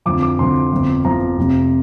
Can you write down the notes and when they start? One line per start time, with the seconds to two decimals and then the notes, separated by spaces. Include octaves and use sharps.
0.06 F2 D3 F3 D6
0.22 D6
0.39 F2 D3 F3 C6
0.72 G1 F2 F3
1.05 G1 F2 F3 A#5
1.38 F1 F2 C3 F3